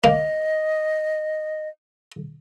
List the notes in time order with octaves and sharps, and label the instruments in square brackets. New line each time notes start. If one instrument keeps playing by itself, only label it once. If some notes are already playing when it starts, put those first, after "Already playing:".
[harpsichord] A#3 [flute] D#5